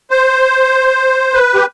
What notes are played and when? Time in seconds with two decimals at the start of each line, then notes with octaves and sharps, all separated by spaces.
0.11 C5
1.34 B4
1.55 G4